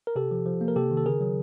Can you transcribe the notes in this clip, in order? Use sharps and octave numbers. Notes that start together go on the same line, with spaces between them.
A#4
C3 G4 A4
F3
F3
A#3
A#4
C3 G4 A4
D#3
A4
C#3 G#4 A#4
F#3